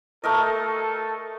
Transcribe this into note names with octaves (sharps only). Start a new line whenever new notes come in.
A3 A4 A#4 D#5